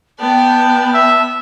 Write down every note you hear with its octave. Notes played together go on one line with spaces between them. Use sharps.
B3 D5 G5 A5
E5